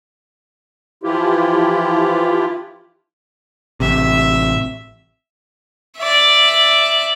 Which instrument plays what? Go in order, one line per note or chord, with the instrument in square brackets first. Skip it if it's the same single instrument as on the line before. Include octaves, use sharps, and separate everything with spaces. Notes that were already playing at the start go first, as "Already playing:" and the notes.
[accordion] E3 F3 E4 F4 G4
[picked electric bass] A1 C3 [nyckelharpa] E5
[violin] D5 E5